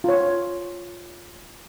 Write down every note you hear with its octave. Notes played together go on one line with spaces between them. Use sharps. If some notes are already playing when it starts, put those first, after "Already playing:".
F4 C#5